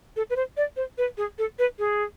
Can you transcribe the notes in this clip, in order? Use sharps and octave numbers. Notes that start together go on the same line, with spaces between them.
A4
B4
C5
D5
C5
B4
G#4
A4
B4
G#4